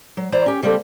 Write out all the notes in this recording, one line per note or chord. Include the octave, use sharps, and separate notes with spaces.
F#3
E3 C5 D5 A#5
C#4 G4
C#3 G3 A#3 C4 A4